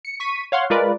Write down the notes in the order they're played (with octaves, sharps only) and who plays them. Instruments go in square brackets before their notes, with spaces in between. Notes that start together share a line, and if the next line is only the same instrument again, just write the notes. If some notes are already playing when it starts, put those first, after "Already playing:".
[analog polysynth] C#7
C#6 B6 D#7
C#5 F5 F#5 C6
G#3 F4 A#4 B4 D5